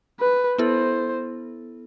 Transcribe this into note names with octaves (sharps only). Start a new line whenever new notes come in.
B4
B3 E4 A4 C5